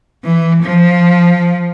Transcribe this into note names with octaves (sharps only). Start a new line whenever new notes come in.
E3
F3